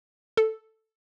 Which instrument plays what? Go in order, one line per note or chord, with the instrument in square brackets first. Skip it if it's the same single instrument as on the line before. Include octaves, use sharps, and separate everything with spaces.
[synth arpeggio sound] A4